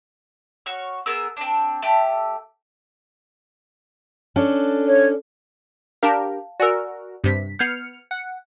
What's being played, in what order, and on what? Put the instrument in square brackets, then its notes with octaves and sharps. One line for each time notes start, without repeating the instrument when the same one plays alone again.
[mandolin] F#4 C#5 C#6 F6
B3 G#4 A#4 E6
C4 D4
A3 G4
[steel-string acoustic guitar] C#4 D4 A4
[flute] C#5
[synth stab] D4 G4 A#4 [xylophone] F5 A5
[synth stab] F#4 A#4 [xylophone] D5 G#5 E6
[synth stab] G2 C3 B6
[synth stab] B3 F6 C#7 [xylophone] G6 G#6 C7
[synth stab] F#5